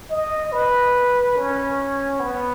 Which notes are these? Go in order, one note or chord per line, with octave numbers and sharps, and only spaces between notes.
D#5
B4
C#4
B3